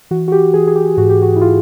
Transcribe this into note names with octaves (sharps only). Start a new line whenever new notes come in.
E3 F#4
F#4
G4
E3 G#4
G#4
G4
G#2 F#4
G4
F#4
E4
F4